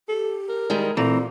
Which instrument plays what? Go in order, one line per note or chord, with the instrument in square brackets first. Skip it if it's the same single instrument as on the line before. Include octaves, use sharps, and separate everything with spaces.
[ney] G4 [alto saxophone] A4
[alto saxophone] A#4
[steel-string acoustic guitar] D#3 G3 G#3
[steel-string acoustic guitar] A#2 [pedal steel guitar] E3 C4 A#5 [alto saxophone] A3 [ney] A4